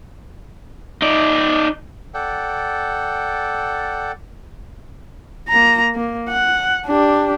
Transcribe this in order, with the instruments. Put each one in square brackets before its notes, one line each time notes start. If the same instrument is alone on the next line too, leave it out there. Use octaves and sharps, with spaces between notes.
[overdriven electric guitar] D#4 D5
[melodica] A4 D5 F#5 G5
[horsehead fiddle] A#3 A#5
A#3
F#5
D4 G4